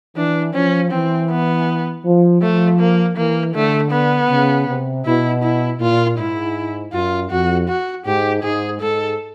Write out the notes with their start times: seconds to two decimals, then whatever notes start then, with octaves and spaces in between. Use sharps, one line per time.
0.16 E3 D4
0.54 F3 C#4
0.91 E3 C4
1.30 B3
2.05 F3
2.42 F3 A3
2.80 A#3
3.16 E3 A#3
3.54 D3 A3
3.91 B3
4.29 C#3
4.67 C3
5.05 B2 E4
5.43 E4
5.80 A#2 F4
6.18 G#2 E4
6.92 F#2 F4
7.30 F2 F#4
7.68 F#4
8.05 G#2 G4
8.43 G#2 G#4
8.80 G#2 A4